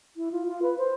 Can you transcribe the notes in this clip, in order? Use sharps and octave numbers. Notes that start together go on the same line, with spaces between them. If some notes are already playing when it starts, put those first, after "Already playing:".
E4
F4
F4
B4
C5